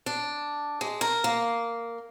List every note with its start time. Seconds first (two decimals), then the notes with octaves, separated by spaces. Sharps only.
0.06 D4
0.81 G#3
1.01 A#4
1.24 A#3